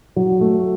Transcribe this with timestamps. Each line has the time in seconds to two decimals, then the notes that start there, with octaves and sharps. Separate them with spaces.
0.16 F#3
0.41 A3